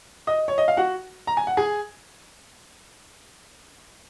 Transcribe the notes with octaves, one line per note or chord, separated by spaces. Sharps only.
D#5 D#6
C#5
D#5
F5
F#4 F#5
A#5
G#5
F#5
G#4 G#5